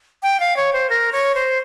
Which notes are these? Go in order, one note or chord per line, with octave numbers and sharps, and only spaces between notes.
G5
F5
C#5
C5
A#4
C#5
C5